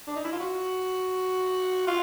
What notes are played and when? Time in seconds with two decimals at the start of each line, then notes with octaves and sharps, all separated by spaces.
0.07 D4
0.16 D#4
0.24 E4
0.32 F4
0.40 F#4
1.87 F4